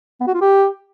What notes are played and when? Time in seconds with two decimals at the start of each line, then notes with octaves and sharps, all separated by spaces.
0.21 B3
0.27 F#4
0.34 F4
0.41 G4